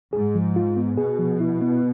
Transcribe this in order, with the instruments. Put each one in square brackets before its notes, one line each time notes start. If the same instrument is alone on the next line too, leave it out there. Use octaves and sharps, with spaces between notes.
[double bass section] G#2 [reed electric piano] G#4
[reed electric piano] F3
F4
B3
[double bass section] B2 [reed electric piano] G#4
[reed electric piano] F3
E4
B3